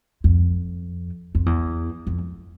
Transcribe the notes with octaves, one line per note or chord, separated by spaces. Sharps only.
F2
F2
E2
F2